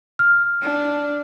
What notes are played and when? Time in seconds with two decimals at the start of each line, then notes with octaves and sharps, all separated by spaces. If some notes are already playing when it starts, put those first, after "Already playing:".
0.19 F6
0.62 D4